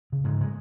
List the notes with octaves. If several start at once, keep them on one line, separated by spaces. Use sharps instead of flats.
C#3
G#2 G#3
G#3